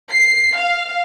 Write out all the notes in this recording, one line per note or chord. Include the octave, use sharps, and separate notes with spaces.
C7
F5